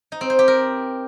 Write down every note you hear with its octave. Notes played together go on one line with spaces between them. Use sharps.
D#4
C4
C5
G4
A#4